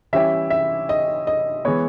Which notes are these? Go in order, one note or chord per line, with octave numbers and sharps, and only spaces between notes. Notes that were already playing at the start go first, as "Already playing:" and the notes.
E3 G3 C#4 E4 G4 E5
E5
D#5
D#5
E3 G#3 B3 C#5